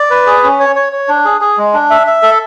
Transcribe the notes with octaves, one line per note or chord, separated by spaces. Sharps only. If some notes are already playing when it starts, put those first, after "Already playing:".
Already playing: D5
B4
G#4
C#4
C#5
C#5
C#5
D4
G#4
G#4
G#3
D4
E5
E5
A4